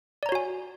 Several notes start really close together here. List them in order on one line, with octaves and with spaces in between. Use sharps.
D5 A#5 C#5 F#4 G#5